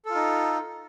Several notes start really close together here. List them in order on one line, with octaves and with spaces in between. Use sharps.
A4 F4 D#4